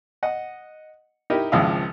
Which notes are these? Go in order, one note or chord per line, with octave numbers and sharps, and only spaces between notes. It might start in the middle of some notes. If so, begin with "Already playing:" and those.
D#5 F#5
D#4 E4 G4 A#4 D#5
G#1 C#2 F3 E4 F5 D#6